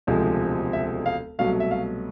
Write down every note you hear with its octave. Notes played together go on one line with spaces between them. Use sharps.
E1 D2 C3 F3 G#3
E5
F5
C2 B2 F#3 A3 F5
E5
F5